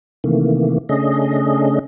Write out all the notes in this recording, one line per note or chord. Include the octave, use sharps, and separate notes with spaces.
C3 D#3 E3 A3 A#3
C#3 A3 C#4 D4 G#4 D#5